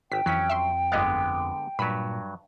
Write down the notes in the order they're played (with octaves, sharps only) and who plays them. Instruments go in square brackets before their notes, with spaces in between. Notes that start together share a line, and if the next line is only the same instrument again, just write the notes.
[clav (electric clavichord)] G#1 [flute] G5 [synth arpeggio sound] B6
[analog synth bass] F2 [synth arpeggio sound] E3 B6 [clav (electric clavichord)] F#3 C#4
[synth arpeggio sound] E5 C6
[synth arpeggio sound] G1 D#5 F5 [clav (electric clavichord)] D3 G#3 B3
[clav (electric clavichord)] G2 F#3 [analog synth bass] A#2 [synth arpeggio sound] B5 B6